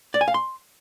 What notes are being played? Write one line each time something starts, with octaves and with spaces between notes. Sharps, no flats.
D5
G#5
F5
C6